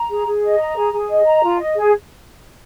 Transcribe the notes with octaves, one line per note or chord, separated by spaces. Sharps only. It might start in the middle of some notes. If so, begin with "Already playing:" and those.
Already playing: A#5
G#4
G#4
D#5
A#5
G#4
G#4
D#5
A#5
F4
D#5
G#4